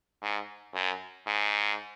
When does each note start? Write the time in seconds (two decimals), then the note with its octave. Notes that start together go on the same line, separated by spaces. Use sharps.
0.22 G#2
0.74 F#2
1.27 G#2